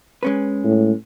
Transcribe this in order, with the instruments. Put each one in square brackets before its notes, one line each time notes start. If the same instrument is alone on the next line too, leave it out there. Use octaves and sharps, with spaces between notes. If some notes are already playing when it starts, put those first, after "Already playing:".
[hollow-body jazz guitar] G#3 C#4 B4
[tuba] A2